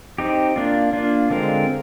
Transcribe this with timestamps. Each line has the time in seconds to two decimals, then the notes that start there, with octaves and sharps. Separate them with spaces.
0.18 C4 D#4 G4
0.56 A#3 D4 F4
0.93 A#3 D4 F4
1.30 D3 G#3 C4 F4 A#4